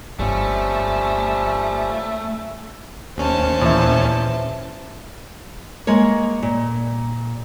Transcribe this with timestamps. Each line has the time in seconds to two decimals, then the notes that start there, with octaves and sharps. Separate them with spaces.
0.19 G1 F3 G3 A3 C#4
3.17 D#2 C#4 C5 A5
3.61 E2 A#2 E5
5.87 G#3 A#3 A#4 C#5
6.42 A#2